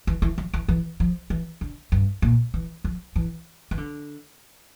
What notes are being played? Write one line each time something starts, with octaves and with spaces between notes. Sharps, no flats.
E3
E3
F3
E3
E3
F3
E3
D3
G2
A#2
E3
F3
E3
E3
D3